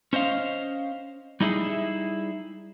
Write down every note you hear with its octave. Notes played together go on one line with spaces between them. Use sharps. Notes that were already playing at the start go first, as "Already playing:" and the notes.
C#4 C5 D#5 F5
G3 D#4 E4 G#4